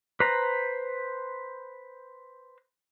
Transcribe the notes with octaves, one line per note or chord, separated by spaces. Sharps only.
B4 C5 A#5